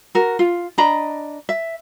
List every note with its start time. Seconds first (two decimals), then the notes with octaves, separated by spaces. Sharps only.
0.15 F#4 A#4
0.39 F4
0.78 D4 D#5 A#5 B5
1.49 E5